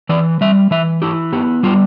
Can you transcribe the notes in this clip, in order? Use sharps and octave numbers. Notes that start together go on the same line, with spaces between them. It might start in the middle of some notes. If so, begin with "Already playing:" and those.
E3 D5
G3 E5
E3 E5
E4 G4
B3 G4
G3 F4